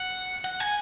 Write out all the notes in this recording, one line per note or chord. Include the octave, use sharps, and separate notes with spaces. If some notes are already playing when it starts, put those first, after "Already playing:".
Already playing: F#5
F#5
G#5